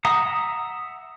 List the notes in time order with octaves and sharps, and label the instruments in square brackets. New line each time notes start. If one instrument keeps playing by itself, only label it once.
[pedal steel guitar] E5 F#5 A#5 D#6